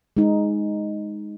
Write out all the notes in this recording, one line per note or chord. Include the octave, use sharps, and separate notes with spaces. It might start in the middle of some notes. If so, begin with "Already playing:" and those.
G#3 D#4